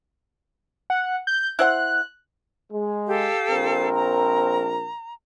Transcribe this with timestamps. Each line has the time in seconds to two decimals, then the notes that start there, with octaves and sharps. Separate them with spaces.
0.90 F#5
1.27 G6
1.59 E4 C5 F#5 F#6
2.72 G#3
3.07 G4 A4 F5
3.50 A#1 C4 A#4
3.95 A#5